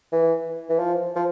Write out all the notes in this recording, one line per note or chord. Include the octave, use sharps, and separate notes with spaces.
E3
E3
F3
F3